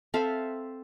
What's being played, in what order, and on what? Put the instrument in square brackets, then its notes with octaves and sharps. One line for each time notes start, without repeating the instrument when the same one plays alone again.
[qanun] C4 A4 E5 F5